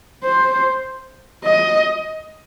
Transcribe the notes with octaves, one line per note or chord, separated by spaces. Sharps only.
C5
D#5